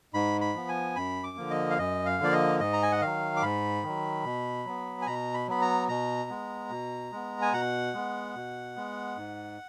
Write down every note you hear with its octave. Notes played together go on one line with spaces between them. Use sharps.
G#2 B5
B5
F3 B3
G#5
F#2 B5
D6
D3 F3 A#3
D#5
F5
F#2 D#5
F5
D3 F3 A#3 D5
D#5
G#2 D#5
A#5
G#5
F#5
D#3 F#3 F5
D6
G#2 B5
D#3 F#3
B2
F#3 B3
G#5
B2 A#5
B5
F#3 B3 B5
A#5
B2 A#5
G#3 B3
B2
G#3 B3
G#5
B2 F#5
G#3 B3
B2
G#3 B3
G#2